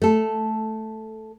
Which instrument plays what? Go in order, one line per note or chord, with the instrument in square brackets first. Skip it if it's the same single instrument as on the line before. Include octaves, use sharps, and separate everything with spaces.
[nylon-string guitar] A3 A4